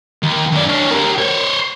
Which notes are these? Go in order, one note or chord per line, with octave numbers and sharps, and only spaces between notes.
D#2
F#2 D5
D4 C#5
G4 A#4
C5 C#5